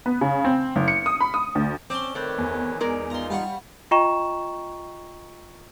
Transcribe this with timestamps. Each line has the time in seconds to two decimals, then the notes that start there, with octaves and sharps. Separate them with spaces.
0.06 B3
0.21 C#3
0.45 C4
0.76 F#1
0.88 C#7
1.06 D#6
1.21 B5
1.34 D#6
1.55 D2
1.90 C4 C#4 D5 A5 C6
2.15 D#3 A3 C4 B4 C#5
2.38 E2
2.80 G#3 D#4 A#4 D5
3.10 D#4 F4 A#5 C6
3.30 G3 F5 F#5 C#6
3.91 F4 D#5 G5 A#5 C#6 E7